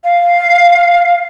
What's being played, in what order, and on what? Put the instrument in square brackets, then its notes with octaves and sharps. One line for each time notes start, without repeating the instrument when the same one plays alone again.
[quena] F5